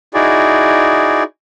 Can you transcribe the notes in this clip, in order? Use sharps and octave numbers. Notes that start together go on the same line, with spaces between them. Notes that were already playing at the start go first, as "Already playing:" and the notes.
D#4 E4 F#4 G#4 D5